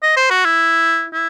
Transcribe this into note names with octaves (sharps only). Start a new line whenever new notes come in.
D#5
C5
F#4
E4
E4